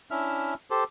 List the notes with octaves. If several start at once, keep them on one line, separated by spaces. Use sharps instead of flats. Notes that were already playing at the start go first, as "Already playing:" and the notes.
C#4 D4 E4 E5 F6
G4 A4 C5